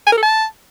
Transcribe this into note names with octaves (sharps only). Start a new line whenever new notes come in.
G#5
A#4
A4
A5